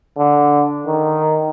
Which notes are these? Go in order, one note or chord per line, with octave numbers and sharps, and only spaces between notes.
D3
D#3